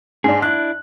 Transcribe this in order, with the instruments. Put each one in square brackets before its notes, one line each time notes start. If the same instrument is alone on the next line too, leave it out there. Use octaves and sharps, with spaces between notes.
[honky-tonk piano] G#2 D4 [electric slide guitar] G#4
[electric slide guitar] D4 E4 [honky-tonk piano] F#6